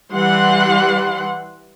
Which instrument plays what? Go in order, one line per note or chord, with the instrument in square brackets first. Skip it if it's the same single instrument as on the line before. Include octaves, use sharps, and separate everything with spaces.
[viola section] E3 G3 F#5 C6